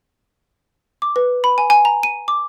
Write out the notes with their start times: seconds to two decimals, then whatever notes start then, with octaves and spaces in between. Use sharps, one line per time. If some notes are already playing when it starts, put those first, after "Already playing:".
1.02 D6
1.16 B4
1.44 B5
1.58 G#5
1.70 G#5
1.85 A#5
2.03 D#7
2.28 D6